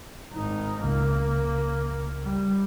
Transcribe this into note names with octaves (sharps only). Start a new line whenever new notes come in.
G#1 D#4
C#2 A#3
G3